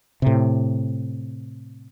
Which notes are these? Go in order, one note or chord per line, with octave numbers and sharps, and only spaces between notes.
A2 C3